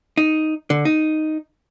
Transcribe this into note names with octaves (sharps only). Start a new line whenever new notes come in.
D#4
D3
D#4